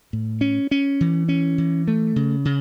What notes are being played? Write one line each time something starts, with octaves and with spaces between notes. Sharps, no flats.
A2
C#4
C#4
E3
C#4
E3
A3
C#3
C#3